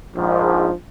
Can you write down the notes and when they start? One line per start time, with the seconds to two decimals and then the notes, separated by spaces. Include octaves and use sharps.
0.16 A#1 G#2 F3